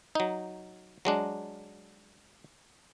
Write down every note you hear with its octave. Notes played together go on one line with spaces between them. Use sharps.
F#3 D#4
F#3 G#3 D4